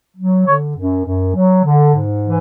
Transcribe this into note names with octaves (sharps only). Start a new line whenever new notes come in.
F#3
D3 C#5
F#2
F#2
F#3
D3
G#2
E3